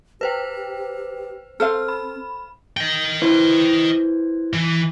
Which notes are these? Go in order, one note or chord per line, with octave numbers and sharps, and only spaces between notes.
G4 B4 C5 G5
C4 A4 C5 F5 F6
B5
D#5 G5
E4 B4 C5
E3